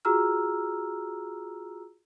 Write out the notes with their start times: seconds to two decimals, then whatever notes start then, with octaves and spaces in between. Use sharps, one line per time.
0.05 F4 F#4 G#4 A#5 E6 F6